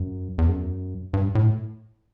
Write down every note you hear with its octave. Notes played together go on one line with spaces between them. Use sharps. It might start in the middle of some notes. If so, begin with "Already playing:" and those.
Already playing: F#2
E2
F#2
G2
A2